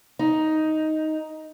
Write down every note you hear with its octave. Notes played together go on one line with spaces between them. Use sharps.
D#4